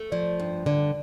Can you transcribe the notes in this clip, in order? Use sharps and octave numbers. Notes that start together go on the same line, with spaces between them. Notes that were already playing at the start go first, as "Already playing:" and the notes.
Already playing: A3
F3 D5
G2
D3 D5